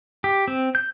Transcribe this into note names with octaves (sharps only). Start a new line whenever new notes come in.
G4
C4
G6